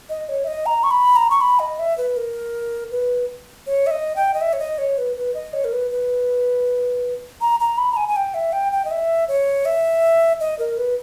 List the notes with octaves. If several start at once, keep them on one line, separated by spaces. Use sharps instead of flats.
D#5
C#5
E5
D#5
A#5
C#6
B5
A#5
C#6
B5
D#5
E5
B4
A#4
B4
C#5
E5
D#5
G5
D#5
E5
C#5
D#5
C#5
B4
B4
D#5
C#5
A#4
B4
B4
A#5
A#5
B5
A#5
G#5
G#5
G5
E5
G5
G5
D#5
E5
C#5
E5
D#5
A#4
B4